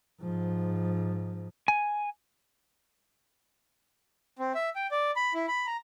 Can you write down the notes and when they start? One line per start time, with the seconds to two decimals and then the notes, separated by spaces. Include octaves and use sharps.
0.21 G#2 F3
1.68 G#5
4.39 C4
4.55 E5
4.76 G5
4.91 D5
5.16 B5
5.34 E4
5.48 B5
5.67 A#5